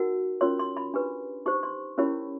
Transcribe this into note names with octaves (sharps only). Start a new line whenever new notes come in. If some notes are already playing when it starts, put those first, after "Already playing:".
Already playing: D#4 F#4 A#4 F#5
C#4 F4 A#4 C#5 C6
C6
B5
D4 G4 B4
D#4 G4 C5 C#6
C6
C#4 E4 G4 A#4 C#5 B5